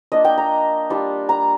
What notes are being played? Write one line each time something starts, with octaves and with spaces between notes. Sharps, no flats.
A#3 D4 F4 D#5
G5
A#5
G3 D4 F4
A#5